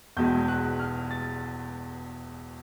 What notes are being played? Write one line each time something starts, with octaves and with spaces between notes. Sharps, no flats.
E1 E2 B2 G#3 G6
F#6
F6
A6